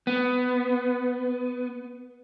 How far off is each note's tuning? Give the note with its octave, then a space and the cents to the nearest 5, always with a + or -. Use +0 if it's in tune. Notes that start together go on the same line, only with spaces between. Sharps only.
B3 +15